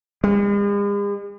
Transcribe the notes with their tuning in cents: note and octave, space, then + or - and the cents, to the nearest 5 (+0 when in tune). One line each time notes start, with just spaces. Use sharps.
G#3 -45